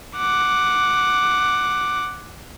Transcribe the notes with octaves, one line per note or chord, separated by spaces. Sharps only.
F#5 D6